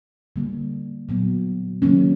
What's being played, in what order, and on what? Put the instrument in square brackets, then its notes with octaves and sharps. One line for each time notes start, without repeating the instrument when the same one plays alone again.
[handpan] D3 G3 A#3
A#2 F#3 B3
D#3 F#3 A#3 C#4